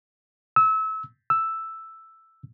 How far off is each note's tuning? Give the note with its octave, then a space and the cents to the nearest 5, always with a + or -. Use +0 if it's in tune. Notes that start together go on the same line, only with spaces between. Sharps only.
E6 -30
E6 +0